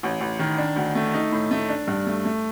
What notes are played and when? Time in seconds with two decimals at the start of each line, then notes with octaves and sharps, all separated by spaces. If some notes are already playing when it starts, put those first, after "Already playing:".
0.03 A1
0.21 A1
0.39 D#3
0.58 D4
0.76 D2
0.95 A3
1.14 D#4
1.32 A2
1.51 A3
1.69 D4
1.88 G2
2.07 A3
2.25 A3